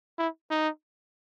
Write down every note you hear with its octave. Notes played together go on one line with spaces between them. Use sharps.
E4
D#4